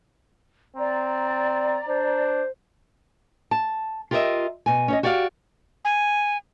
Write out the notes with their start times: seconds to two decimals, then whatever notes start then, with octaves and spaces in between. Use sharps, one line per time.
0.77 C4 D5 A#5
1.88 D4 C5
3.51 A5
4.11 F4 G4 A#4 C#5 D#5 E5
4.66 B2 G#5
4.88 C#4 C#5 D#5
5.03 F#4 G4 D5 E5 F5
5.85 G#5